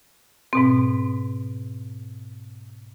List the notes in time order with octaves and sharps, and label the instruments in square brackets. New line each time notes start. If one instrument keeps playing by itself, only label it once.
[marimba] G#2 B2 C4